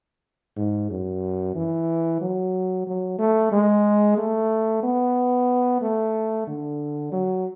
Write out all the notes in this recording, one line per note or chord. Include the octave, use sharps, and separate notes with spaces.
G#2
F#2
E3
F#3
F#3
A3
G#3
A3
B3
A3
D3
F#3